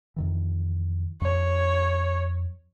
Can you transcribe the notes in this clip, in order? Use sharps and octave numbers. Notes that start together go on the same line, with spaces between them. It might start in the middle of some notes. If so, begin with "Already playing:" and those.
F2 D#3 E3
F2 C#5